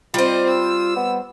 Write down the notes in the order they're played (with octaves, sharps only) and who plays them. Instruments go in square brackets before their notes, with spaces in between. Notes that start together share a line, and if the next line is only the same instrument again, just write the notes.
[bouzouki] G3 C5 [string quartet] C4 D#5 [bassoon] F4
[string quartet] E6
[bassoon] B3